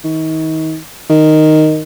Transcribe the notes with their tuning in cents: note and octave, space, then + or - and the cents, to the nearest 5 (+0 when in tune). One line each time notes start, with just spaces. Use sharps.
D#3 +35
D#3 -5